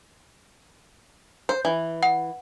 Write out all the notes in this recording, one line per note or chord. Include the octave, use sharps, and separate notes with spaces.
C5
E3
F#5